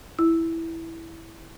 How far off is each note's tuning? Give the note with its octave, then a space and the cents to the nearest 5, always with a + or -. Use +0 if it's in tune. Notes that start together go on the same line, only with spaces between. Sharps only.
E4 -5